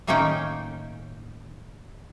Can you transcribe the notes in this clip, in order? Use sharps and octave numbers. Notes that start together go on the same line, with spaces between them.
A2 D#3 A#3 C#4 D#4 G5